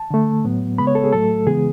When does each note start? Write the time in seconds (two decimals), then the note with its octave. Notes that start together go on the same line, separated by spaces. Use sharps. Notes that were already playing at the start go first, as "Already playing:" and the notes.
Already playing: A5
0.10 D3 A3
0.45 A2 F#3 B3
0.78 C#3 G#3 B3 B5
0.87 C#5
0.95 A4
1.04 G#4
1.13 A2 F#3 A3 A4
1.47 C#3 E3 G#3 B3 G#4